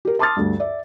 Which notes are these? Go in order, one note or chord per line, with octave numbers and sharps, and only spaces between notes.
G4 A#4
A5 C6 D6 D#6 F6 A6
D2 G2
D5 E5